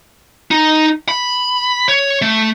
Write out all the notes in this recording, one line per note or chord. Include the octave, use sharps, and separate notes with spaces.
D#4
B5
C#5
A3